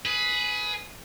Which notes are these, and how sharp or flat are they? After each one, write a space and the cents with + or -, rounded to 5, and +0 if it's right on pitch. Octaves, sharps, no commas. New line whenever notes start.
G#4 +20 B4 +0